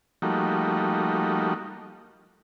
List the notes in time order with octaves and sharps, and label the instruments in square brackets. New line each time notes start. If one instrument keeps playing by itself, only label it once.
[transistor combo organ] F3 G3 A3 A#3 D#4 F#4